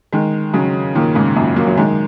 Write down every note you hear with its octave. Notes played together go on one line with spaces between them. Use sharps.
D#3 G#3
C#3 F#3
A#2 D#3
G#2 C#3
F#2 A#2
F#3 A#3
F#3
D#3 G#3